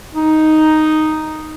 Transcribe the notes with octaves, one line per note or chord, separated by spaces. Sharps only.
D#4